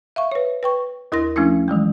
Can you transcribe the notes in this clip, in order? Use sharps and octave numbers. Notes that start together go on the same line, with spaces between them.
E5 F5 C#6
B4 C#5
B4 G5 C#6
D#2 E4 A#4 C6 A#6
F3 A3 C#4 D4 E4
D#3 E3 F#3 G#3